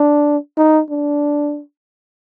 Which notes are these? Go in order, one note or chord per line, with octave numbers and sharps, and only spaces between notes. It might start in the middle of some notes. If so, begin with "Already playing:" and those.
Already playing: D4
D#4
D4